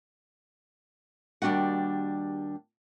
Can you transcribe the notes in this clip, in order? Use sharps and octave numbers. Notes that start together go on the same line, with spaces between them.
D#2 G3 D4 F#4 F#5